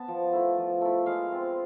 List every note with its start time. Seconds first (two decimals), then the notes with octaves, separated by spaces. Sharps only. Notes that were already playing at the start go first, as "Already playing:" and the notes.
Already playing: B3 A5
0.08 F3
0.33 A3 E4
0.57 F3
0.81 A3 E4
1.06 G#3 F5
1.32 C4 F4